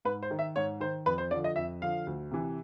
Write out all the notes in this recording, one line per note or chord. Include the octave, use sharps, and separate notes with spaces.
G#2 B4
C5
D#3
E5
G#2 C#5
D#3 C5
F2 B4
C5
D3 F3 D5
D#5
F2 E5
D3 F3 F5
D2
C3 E3